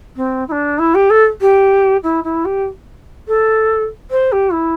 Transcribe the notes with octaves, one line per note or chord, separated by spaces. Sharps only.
C4
E4
D4
E4
G4
A4
G4
E4
E4
G4
A4
C5
G4
E4